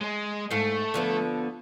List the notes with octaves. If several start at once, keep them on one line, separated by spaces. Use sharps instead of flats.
G#3
G#2 A3 F5
D3 F3 B3